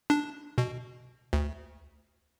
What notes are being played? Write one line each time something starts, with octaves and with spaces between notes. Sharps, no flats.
D4
B2
D2